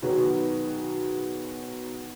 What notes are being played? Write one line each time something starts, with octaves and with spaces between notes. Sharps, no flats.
B2 D#3 F#3 D#4 G#4 B4